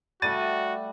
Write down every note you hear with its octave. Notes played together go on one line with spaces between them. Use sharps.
G3 A3 F#4 A6 D#7